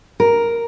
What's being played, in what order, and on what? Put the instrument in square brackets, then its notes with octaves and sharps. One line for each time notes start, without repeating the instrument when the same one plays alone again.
[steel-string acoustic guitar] A#4